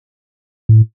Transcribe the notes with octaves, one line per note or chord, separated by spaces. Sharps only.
A2